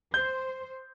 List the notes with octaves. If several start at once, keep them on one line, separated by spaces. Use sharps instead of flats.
C5 G6